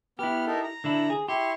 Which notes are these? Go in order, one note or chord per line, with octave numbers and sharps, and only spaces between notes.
B3 E4 G4 F6
D#4 A4 A#4
A#5
D3 D4 E4
G#4
E4 G4 C6 C#6